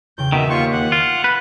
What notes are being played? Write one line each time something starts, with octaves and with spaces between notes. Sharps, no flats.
E2 C#3 G5 G6
B2 D#3 E5
D#2 F4 C6 C#6 B6 C#7
F#5 D6 D#6
F4
B4